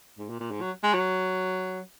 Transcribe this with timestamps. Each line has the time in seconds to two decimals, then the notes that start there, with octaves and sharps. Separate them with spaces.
0.18 G#2
0.30 A#2
0.40 A#2
0.51 G#2
0.61 F#3
0.83 G#3
0.94 F#3